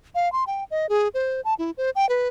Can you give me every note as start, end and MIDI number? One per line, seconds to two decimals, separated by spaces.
0.15 0.31 77
0.32 0.44 84
0.47 0.64 79
0.71 0.89 75
0.89 1.08 68
1.14 1.41 72
1.45 1.54 81
1.59 1.71 64
1.77 1.90 72
1.95 2.08 79
2.09 2.28 71